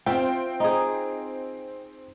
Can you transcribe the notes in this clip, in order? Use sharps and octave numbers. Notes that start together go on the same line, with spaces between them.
C4 F4 C5 E5 G5
D#4 G#4